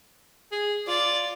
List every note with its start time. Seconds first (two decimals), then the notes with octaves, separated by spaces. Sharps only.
0.52 G#4
0.87 F4 D5